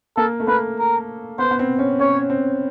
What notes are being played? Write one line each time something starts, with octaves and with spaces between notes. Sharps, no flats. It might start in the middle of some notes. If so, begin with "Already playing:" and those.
A#3 A4
A3
A#3 B4
A#4
B3 C5
B3
C4
C#4
C#4 C#5
C4